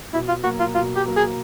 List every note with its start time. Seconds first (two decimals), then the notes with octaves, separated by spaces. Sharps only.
0.13 B2 E4
0.28 F4
0.44 F#3 A#3 F#4
0.60 F4
0.75 B2 F4
0.96 G4
1.06 F#3 A#3
1.17 G#4